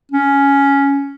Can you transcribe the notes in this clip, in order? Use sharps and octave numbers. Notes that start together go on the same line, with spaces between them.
C#4